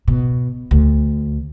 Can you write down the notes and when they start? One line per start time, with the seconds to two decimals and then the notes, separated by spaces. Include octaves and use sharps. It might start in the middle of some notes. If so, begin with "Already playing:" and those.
0.08 B2
0.71 D2